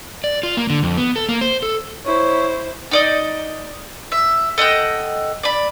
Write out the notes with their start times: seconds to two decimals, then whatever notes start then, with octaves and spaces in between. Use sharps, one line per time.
0.24 D5
0.43 F4
0.57 A#3
0.70 D3
0.83 F2
0.97 B3
1.16 A4
1.29 A#3
1.41 C5
1.62 A4
2.06 E4 C5 C#5
2.91 D#4 D5 D#5
4.12 E5
4.58 A4 D#5 F#5 G5
5.43 D5 B5